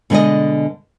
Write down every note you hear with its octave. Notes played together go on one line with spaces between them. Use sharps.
B2 D3 G#3 A#4 D5 D#5